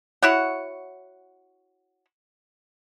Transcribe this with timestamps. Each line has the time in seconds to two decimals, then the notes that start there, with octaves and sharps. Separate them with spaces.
0.22 E4 F#4 C#5 F#5